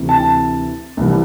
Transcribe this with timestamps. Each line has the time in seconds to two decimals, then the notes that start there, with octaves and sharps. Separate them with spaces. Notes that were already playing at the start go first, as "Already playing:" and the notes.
Already playing: D2 C3 E3
0.09 A5
0.97 C2 C3 E3